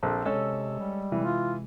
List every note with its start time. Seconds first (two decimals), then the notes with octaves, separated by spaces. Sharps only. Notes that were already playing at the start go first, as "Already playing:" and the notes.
0.03 A#1 C4 A4
0.25 C3 G#3 C#4 A4 D#5 E6
0.79 G3
1.12 C3 E3 G#3
1.24 F4